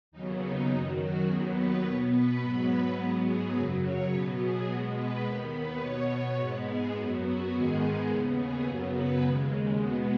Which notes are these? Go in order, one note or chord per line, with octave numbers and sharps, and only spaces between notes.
D#2 C#3 F#3 B3 D#4
D#4
F#2 D#3 F#3 D#4
F#4
D#2 D#3 F#3 B3 G#4
B4
B2 B3 C#5
B4
G#2 F#3 B3 B4
G#2 F#3 B3 G#4
G#4
F#2 C#3 F#3 B4
C#5
B2 F#3 B3 B4
G#4
B2 G#3 B3 F#4
B4
D#2 D#3 B3 B4
B4
B2 B3 C#5
G#2 G#3 B3 B4
G#4
F#2 F#3 B3 F#4
F#4
G#2 D#3 G#3 B3 G#4
D#2 C#3 B3
G#4
F#2 C#3 F#3 B3
B4
D#2 C#3 G#3
B2 G#3 B3 F#4